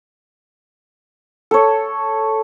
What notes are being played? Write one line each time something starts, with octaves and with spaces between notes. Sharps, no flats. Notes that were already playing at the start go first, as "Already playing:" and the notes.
A4 C#5